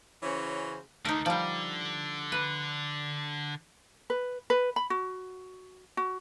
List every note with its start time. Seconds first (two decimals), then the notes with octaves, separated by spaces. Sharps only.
0.23 C#3 E3 C#4 F#4 C5 C#5
1.05 D3 A3 D#4 A#4
1.26 D3 F3 G3 D5
2.32 B4
4.10 B4
4.50 B4
4.76 B5
4.90 F#4
5.97 F#4